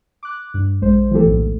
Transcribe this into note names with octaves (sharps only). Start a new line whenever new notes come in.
D6 F#6
G2
A#1 G#3 C5
E3 F3 A3 B3 G4 A4
A#1 D#2 A2